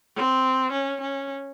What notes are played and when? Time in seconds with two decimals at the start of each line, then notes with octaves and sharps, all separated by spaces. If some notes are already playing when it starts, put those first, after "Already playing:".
0.16 C4
0.72 C#4
1.01 C#4